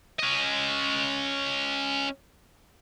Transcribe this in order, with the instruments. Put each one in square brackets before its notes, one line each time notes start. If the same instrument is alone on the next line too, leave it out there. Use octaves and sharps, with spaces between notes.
[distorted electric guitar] C#4 D#5